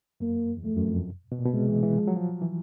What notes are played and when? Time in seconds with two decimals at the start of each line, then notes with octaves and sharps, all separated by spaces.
0.20 F#2 A#3
0.57 E2
0.65 F2 A3
0.77 F#2
0.88 F2
1.32 B2
1.39 A#2
1.45 B2
1.53 C3 G#3
1.68 E3
1.83 E3
1.98 F3
2.08 F#3
2.16 F3
2.42 E3